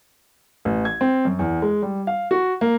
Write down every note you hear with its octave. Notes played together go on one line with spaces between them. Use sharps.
A1
G#6
C4
F#2
E2
G#3
G3
F5
F#4
A#3